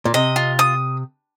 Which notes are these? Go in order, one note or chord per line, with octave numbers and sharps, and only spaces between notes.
A#2
C3 D#5
F4
D#6